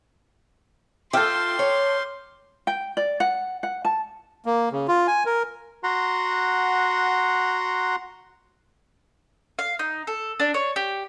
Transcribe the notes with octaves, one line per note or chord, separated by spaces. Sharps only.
F4 A4 E5 G5 C6 D6 F6 G6
C#5
G5
D5
F#5
F#5
A5
A#3
C#3
F4
G#5
A#4
F#4 F#5 A#5 C6
F5
D#4
A4
D4
C#5
G4